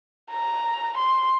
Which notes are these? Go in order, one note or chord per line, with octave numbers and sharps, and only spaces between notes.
A#5
C6